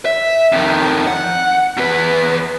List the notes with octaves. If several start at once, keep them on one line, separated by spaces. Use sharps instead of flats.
E5
F2 D#3
F#5
E2 B4